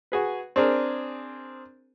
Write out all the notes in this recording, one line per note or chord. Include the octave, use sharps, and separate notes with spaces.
F#4 G#4 B4
C4 D4 G#4 A#4